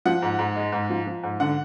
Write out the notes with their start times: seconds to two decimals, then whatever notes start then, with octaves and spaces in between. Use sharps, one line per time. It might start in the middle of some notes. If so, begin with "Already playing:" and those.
0.05 F3 F#5
0.22 G#2
0.39 G#2
0.55 G#3
0.72 G#2
0.90 F3
1.06 F3
1.23 G#2
1.40 D3 F#5